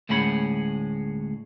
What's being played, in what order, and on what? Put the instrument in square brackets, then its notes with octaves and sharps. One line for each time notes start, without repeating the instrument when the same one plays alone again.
[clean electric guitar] D2 A2 G#3 C#4 F#5 B5